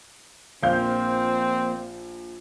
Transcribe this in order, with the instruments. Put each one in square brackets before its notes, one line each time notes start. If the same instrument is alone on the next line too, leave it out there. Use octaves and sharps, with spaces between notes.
[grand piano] A#1 F5 G6 [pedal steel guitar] F3 A#3 [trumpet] C4